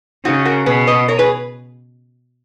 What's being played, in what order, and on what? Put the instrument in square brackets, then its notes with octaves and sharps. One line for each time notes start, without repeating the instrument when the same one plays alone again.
[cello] C#3 [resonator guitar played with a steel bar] D#4 F#4
[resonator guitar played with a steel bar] F#4 A#4
[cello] B2 [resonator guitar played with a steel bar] G#4 B4
[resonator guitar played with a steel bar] B4 D#5
A#4 C#5
G#4 B4